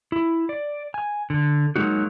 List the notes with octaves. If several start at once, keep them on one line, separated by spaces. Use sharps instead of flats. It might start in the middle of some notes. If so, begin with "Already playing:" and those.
E4
D5
G#5
D3
F#3 G#3 A#3 D#4 F#4